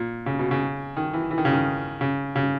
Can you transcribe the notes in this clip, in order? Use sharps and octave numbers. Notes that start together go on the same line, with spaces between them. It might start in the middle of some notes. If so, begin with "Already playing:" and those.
Already playing: A#2
C#3
B2
C#3
D#3
E3
E3
D#3
C#3
D#3
C#3
C#3